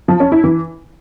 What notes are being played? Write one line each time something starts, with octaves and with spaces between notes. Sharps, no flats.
F3
C#4
E4
E3